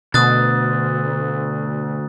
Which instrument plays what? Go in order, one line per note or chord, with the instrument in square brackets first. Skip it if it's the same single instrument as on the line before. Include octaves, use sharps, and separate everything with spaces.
[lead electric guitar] D2 D3 [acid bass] B2 [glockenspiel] D#6 F#6 A6